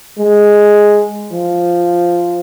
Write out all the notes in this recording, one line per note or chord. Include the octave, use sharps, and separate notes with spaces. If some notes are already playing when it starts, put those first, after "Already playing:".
G#3
F3